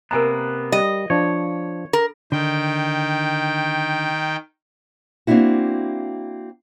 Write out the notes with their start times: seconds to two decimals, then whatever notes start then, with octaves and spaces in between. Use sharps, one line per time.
0.11 C3 A#3 B3 A#4 G#5 A#5
0.72 G3 D#5
1.10 F3 D4 C#5
1.93 A#4
2.32 D3 D#3 G5
5.27 A#3 C4 D4 E4 F#4